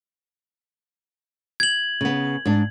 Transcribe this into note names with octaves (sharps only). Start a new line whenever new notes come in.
G#6 F#7
C#3 B3
G#2 D4